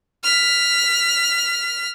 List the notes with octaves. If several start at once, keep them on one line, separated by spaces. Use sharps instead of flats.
F6 B6